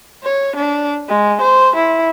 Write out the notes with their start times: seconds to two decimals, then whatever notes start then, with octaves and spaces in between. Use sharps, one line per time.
0.24 C#5
0.56 D4
1.08 G#3
1.42 C5
1.76 E4